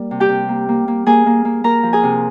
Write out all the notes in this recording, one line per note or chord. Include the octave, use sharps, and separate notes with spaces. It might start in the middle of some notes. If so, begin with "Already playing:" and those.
Already playing: G3 A#3
C3
G4 G5
C3
A#3
A#3
A#3
A#3 G#4 G#5
A#3
A#3
A#3 A#4 A#5
F3
G#4 G#5
C3